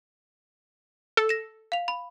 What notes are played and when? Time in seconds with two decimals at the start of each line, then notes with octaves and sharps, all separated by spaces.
1.17 A4
1.29 A#6 E7
1.72 F5 F7
1.88 B5